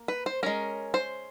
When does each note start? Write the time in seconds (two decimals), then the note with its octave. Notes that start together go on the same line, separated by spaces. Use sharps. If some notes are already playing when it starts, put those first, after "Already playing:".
Already playing: A#3
0.08 B4
0.26 C5
0.43 G#3 C#4 A#4
0.94 C5